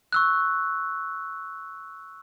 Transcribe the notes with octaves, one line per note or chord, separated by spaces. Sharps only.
C#6 E6 F#6